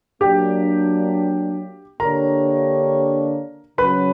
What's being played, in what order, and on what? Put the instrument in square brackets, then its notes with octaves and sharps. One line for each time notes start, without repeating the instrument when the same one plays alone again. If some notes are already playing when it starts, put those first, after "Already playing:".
[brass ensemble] F#3 A#3 D4 [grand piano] G4 G5
[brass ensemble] D3 A#3 D4 G4 C#5 [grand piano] A#4 A#5
[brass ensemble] C#3 F#3 C#4 F#4 [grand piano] B4 B5